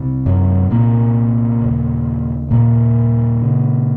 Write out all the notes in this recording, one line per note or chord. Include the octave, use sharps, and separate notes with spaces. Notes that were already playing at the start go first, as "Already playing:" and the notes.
Already playing: C2 C3
F#2 F#3
A#2 A#3
D#2 C#3
A#2 A#3
C#3